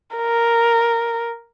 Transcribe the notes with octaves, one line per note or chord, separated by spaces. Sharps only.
A#4